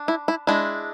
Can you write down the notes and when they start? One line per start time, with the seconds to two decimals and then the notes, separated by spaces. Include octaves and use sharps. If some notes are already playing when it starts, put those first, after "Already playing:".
Already playing: D4
0.08 E4
0.28 E4
0.47 G#3 D4 E4